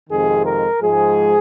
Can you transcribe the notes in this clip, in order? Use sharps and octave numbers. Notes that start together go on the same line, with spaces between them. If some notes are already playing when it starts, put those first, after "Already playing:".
F2 C3 D#3 G#3 G#4
A#4
G#2 F3 G#3 G#4